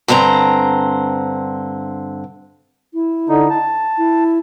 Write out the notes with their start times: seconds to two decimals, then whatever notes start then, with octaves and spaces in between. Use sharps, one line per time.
0.08 G2 D3 C4 C5 A#5
2.94 E4
3.29 D3 D#4
3.50 A5
3.98 E4